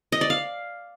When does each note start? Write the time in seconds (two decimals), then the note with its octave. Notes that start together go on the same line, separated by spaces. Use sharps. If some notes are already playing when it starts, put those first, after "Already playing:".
0.12 D#5
0.21 D5
0.30 F5